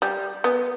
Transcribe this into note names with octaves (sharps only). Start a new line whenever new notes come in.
G3
B3